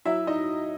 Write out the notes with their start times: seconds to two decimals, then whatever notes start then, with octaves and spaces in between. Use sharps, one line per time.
0.05 F#3 E4 E5
0.27 D#4 D#5